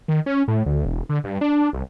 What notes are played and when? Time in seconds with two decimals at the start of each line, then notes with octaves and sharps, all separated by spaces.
0.08 D#3
0.26 C#4
0.48 A2
0.66 D2
0.85 E1
1.09 D3
1.24 G2
1.41 D4
1.73 C2